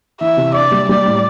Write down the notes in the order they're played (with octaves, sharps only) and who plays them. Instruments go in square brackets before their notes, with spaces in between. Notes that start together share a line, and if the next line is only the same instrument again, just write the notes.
[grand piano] E3 [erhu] E5
[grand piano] C3
[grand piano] D4 [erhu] D5
[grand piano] G3
[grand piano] G3 [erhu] D5
[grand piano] A2